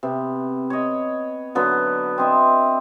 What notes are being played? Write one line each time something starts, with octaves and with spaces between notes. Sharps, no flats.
C3 B3
C#5 D#5
D3 F#3 B3
C4 D#5 E5